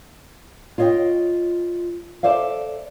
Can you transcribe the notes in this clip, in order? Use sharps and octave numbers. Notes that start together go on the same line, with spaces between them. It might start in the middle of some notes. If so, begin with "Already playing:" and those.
F4 C#5 D#5 F5 G5
A4 C5 D5 E5 F5